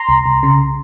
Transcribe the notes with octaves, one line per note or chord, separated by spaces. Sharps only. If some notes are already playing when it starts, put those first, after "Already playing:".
Already playing: A#5 C6
C2
C2
C#3